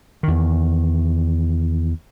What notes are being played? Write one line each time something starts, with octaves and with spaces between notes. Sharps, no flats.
E2 D#3